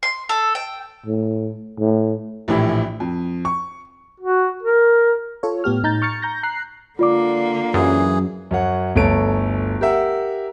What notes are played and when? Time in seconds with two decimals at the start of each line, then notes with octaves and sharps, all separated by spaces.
0.03 C6
0.29 A4
0.55 G5
1.06 A2
1.79 A2
2.48 A#1 A2 E3 E4 G4
3.00 F2
3.45 C#6
4.20 F#4
4.63 A#4
5.43 F4 A4 C#5
5.64 A2 B3 G4 F6
5.83 A2 D#4 A#5 G6 A6
6.02 C#6 F6 A6 C#7
6.22 A#5 G6 A#6
6.43 A#5 F#6 C7
6.99 D3 A#3 F4 D5 D6
7.74 F#2 E3 G#4
8.51 F#2 C#5 F#5
8.96 G1 D2 A4 C#5 D7
9.81 G4 A#4 E5 F#5